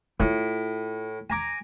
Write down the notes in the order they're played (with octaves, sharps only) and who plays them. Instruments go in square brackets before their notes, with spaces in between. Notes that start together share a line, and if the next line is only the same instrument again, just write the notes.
[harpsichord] A2 [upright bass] E4 F4
[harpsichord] G#5 A#5 D6